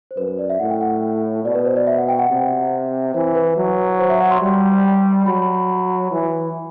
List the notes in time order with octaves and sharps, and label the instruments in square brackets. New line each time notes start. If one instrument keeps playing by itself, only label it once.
[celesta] C5
[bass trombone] F#2 [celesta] B4
[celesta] B4
D5
E5
[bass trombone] A2 [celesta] F#5
[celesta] G5
F#5
[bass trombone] B2 [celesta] D5
[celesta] B4
C5
D5
E5
F#5
G5
F#5
[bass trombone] C3
[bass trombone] E3 [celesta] C5
[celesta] B4
[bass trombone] F#3
[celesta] C5
E5
F#5
C6
[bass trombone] G3
[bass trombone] F#3 [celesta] B5
[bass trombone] E3